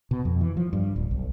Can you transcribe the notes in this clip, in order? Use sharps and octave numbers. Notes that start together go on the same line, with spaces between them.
B2
F2
E3
F3
G2
D1
B1